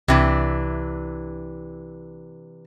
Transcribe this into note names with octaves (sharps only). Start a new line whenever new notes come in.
C2 C3 E3 D4